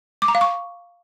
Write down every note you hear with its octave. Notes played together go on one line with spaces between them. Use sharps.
D6
A#5
F5
C#6